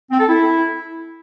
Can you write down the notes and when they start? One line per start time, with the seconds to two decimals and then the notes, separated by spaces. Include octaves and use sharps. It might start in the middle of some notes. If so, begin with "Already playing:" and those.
0.11 C4
0.20 A4
0.29 E4